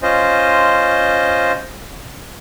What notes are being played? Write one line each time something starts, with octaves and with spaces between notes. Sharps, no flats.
C#4 F4 C5 D#5